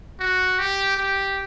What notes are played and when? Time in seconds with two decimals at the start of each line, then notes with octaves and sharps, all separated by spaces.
0.20 F#4
0.59 G4
0.97 G4